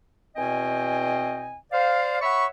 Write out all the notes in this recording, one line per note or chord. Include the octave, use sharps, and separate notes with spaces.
E2 B2 C4 D#5 G5 G#5
C5 D5 F5
C#5 E5 F#5 B5 C#6